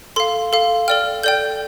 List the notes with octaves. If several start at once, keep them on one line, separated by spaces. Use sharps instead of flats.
A4 F5 C6
A4 F5
A4 D5 G5 F6
A4 D5 G5 G6